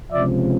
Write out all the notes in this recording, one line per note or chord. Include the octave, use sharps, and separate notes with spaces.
C#2 C3 F3 D5 E5